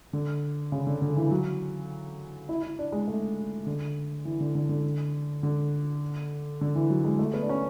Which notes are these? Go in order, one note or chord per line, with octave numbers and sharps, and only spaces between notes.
D3
C#3
D3
D3
E3
F#3
E4
E4
D4
G#3
A3
D3
E3
D3
D3
D3
D3
D3
E3
F#3
G#3
A3
B3
D4
C#4